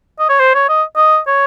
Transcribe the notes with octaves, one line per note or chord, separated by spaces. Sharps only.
D#5
C#5
C5
C#5
D#5
D#5
C#5